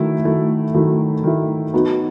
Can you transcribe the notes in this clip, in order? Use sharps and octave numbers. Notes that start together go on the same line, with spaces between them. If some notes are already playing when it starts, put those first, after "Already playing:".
Already playing: D#3 F#3 A3 E4
D#3 F#3 A3 E4
D#3 F#3 A3 E4
D#3 F#3 A3 E4
F#3 B3 D#4 F#4